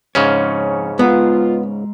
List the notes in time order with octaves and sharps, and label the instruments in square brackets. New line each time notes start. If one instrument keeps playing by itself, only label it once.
[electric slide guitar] F2 C#5 [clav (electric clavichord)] G#2 C#3 C#4
[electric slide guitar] G#3 A#5 [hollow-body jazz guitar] B3 [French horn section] F4